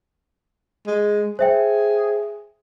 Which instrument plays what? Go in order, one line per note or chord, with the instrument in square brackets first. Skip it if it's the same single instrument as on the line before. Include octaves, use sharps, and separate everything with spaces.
[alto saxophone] G#3
[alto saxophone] G#4 [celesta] C5 E5 G5